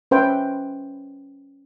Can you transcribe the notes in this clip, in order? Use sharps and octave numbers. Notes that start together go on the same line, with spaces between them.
C#4 B4 C5 E5 G5